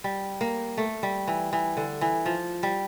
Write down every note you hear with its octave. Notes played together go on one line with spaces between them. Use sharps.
G3
A#3
A3
G3
E3
E3
D3
E3
F3
G3